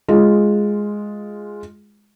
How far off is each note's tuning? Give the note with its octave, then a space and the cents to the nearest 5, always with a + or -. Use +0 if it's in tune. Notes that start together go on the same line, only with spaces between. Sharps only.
G#3 +0 F4 +0